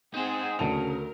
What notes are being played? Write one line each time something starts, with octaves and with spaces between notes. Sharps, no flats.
C4 D#4 G#4 C5 F#5
D2 C#3 A#4 A5 F7